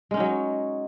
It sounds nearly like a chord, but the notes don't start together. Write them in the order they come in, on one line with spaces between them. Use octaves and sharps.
G#3 C#4 D#4 F#3